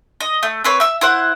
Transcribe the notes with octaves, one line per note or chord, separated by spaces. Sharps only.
D#5
A3
C4 B4 C#5
E5 E6
E4 C5 F#5